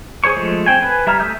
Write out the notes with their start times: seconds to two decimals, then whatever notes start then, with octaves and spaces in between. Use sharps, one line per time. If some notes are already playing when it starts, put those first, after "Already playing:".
0.24 G#4 C5 C#5 C#6
0.37 F3 G#3 A3
0.66 C4 G5 G#5
0.81 B4 G#5
1.07 G3 E5 A#5 F6
1.20 A3 E5 D#6 E6 G6